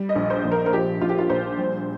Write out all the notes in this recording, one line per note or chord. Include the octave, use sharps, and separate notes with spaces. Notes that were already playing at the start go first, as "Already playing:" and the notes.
Already playing: G3
D#5
A#1
C5
A#1
A#4
A#4
F3 G4
A#1 F4
G4
F4
A#1 C5
G3